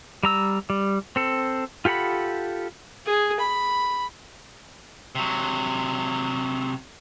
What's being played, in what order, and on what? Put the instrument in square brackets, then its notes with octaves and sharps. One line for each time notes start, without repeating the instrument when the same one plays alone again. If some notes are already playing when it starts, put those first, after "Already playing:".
[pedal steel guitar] G3 A#5 E6
G3
C4 A4
F4 G4 A4 F#5 B5
[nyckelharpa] G#4
B5
[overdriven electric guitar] C3 F#3